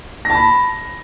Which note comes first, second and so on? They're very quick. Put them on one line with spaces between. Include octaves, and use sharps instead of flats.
A#6 A5 B5